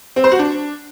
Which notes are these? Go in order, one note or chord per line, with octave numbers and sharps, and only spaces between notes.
C4
C5
F#4
D4